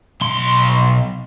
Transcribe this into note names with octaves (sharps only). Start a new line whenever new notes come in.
B1 C6